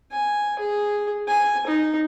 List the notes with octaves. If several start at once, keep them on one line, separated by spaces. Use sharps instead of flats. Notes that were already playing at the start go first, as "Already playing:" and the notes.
G#5
G#4
G#5
D#4